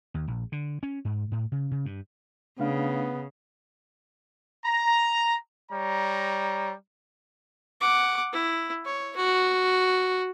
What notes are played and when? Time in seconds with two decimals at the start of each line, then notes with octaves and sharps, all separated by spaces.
0.14 D#2
0.28 A#1
0.52 D3
0.83 C#4
1.05 G#2
1.32 A2
1.52 C#3
1.71 C#3
1.86 G2
2.59 C#3 A3 B3 D4 F5
4.65 A#5
5.71 G3 C#5 A#5
7.81 F#5 D6
8.33 E4
8.85 C#5
9.16 F#4